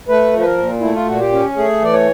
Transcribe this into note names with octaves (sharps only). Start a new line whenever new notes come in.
A3 B4
F3
B4
A#4
A#2
A3 E4
F4
A#2 F#4
G4
C#4
A3 G#4
E3 D5
C#5